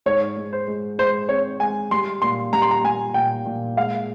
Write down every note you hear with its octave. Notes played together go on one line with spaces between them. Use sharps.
G#2 C#5
G#3
C5
G#3
G#3 C5
C4 C#5
G#3 G#5
G3 C6
A#2 C6
G3 A#5
C6
A#5
G3 G#5
A#2 G5
A#2
G#3 F5